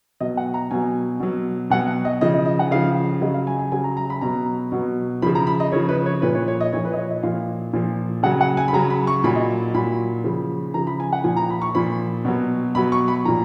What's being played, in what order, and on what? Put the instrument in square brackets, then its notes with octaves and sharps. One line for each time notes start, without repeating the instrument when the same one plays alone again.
[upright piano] B2 F#3 D#5
F#5
A#5
B2 F#3 G#5
B2 F#3
B2 F#3 F#5
D#5
C#3 F3 D#5
D#5
D#5
F#5
C#3 F3 F5
C#3 F#3 D#5
F5
G#5
G#5
C#3 F#3 G#5
A#5
A#5
B5
B2 F#3 A#5
B2 F#3
C#3 F3 B5
A#5
B5
D#5
C#3 F3 C#5
B4
C#5
A#2 F3 B4
C#5
C#5
D#5
A#2 F3 C#5
B4
D#5
C#5
D#5
A#2 F3 F5
A#2 F3
C#3 F#3 F#5
F#5
G#5
B5
C#3 F#3 A#5
B5
C#6
A#2 F#3 B5
D#5
A#2 F#3 B5
C#3 F3
C#3 F3 A#5
B5
G#5
F#5
A#2 F3 G#5
A#5
B5
C#6
A#2 F3 B5
B2 F#3
B2 F#3 B5
C#6
B5
A#2 F3 A#5